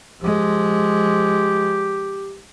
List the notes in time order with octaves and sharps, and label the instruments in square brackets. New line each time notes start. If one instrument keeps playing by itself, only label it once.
[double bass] F3 G#3 [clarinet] G4